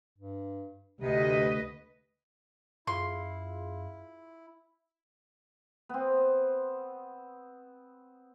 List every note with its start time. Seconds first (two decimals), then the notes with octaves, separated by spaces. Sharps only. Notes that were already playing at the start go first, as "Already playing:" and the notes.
0.18 G2
1.01 D2 C3 B4 D#5
2.87 F#2 E4 F4 G#4 F5 C6
5.89 B3 C4